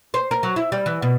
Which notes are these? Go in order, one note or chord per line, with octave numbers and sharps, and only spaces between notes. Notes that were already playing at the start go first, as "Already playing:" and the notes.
C5
A#4
F#3
E4
G3
E3
B2